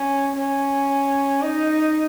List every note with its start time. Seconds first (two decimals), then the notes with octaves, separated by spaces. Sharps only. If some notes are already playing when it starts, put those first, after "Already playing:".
Already playing: C#4
0.37 C#4
1.42 D#4